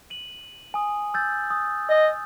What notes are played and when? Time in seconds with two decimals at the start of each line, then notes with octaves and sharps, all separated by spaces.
0.10 D#7 F#7
0.74 G#5 D#6
1.14 E6 G6 A6
1.51 D#6
1.89 D#5